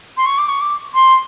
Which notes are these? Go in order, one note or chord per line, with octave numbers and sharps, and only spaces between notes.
C6
C#6
D6
C#6
D6
C6